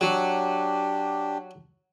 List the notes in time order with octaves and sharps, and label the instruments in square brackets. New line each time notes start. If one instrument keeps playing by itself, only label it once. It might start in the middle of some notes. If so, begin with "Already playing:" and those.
[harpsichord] F#3 [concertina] D4 G4